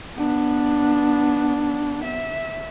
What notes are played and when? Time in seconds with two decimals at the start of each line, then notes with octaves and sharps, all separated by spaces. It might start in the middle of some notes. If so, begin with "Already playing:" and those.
0.18 B3 D4
2.04 E5